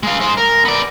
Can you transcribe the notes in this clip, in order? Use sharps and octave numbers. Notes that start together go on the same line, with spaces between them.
G#3 F5
G#3 C5
A#4
B3 D5